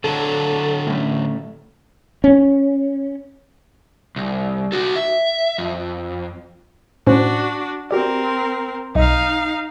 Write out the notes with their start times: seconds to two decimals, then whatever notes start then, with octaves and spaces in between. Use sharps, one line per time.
0.04 D3 F#3 A4
0.87 A2 A3 C#4
2.24 C#4
4.16 C2
4.72 F#4 A4
4.96 E5
5.58 F2
7.07 A2 C#4 D4 F#4 C5
7.91 C4 F#4 G4 A#4 D5
8.95 B1 D#4 D#5 F5